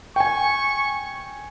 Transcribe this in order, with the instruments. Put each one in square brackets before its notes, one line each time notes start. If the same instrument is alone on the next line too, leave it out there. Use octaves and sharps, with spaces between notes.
[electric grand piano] G5 G#5 [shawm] C#6